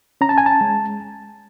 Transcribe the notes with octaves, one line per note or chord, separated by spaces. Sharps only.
C#4 A#5
A5
G#5
A5
G#3